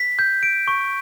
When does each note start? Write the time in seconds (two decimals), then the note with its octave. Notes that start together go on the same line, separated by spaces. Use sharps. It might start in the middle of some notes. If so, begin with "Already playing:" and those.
Already playing: B6
0.19 G6
0.43 D7
0.68 C#6